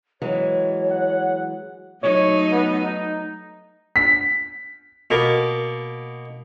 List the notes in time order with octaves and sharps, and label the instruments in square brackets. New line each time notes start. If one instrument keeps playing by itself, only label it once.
[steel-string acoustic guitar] E3 F#3 G#3 [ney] C#5
[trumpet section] F#5
[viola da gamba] F#3 A3 D#4 [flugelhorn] C#5
[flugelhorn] B3
D#4
[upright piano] B6
[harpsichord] B2 A#3